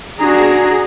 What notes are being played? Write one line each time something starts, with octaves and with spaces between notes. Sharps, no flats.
D4 F#4 G#4 A#5